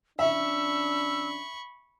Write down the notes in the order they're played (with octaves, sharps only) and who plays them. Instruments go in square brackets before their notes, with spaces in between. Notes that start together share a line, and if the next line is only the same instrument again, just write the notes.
[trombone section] F2 C#4 D4 [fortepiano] E5 [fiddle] B5 C#6 [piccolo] E6